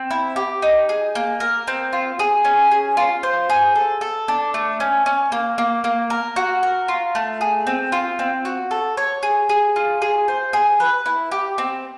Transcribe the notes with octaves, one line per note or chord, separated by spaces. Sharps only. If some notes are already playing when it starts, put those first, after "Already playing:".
Already playing: C4
E4
G4
D#4
G#4
A#3
A#4
C4
F4
G#4
C#4
G#4
F4
C5
G#4
A4
A4
D4
A3
C#4
C#4
A#3
A#3
A#3
A#4
F#4
A#4
F4
A3
G#4
C4
F4
C4
F#4
A4
C#5
G#4
G#4
F4
G#4
C5
G#4
B4
E4
G4
C4